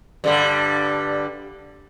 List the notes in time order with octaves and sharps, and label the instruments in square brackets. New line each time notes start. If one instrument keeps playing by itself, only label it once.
[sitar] G2 D3 G3